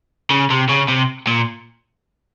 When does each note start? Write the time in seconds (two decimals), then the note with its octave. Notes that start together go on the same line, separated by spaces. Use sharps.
0.30 C#3
0.50 C3
0.69 C#3
0.88 C3
1.27 A#2